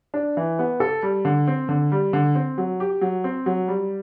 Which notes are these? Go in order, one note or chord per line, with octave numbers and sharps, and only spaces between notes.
D4
E3
B3
A4
G3
D3
C4
D3
G3
D3
C4
F#3
G4
F#3
C4
F#3
G3